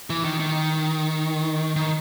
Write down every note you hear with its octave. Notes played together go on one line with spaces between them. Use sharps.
E3
D#3
D#3
D#3